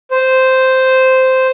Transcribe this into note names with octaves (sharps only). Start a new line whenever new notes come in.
C5